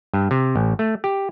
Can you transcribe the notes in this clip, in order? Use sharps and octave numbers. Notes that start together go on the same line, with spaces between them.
G2
C3
A1
A3
G4